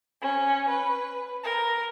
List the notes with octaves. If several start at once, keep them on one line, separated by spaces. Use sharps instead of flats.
C#4
B4
A#4